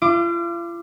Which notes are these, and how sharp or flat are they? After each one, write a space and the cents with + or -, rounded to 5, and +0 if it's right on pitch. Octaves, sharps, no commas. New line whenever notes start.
F4 -40 D6 +10